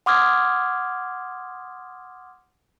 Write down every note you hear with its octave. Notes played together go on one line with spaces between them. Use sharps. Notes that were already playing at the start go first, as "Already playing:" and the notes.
F#5 C6 D6 D#6 F6 G#6